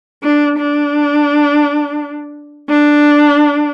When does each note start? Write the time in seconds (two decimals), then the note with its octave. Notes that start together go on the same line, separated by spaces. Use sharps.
0.23 D4
0.58 D4
2.69 D4